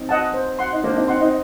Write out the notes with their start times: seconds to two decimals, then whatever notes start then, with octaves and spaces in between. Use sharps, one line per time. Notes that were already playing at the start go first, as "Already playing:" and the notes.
Already playing: C4 D#4
0.09 D#5 F#5 A5
0.34 C5
0.59 F#5 C6
0.73 D#4
0.84 A#3 D4 C5
0.96 C4 D#4
1.08 C4 D#4 F#5 C6
1.21 C4 D#4